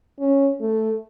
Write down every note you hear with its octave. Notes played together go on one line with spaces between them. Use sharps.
C#4
A3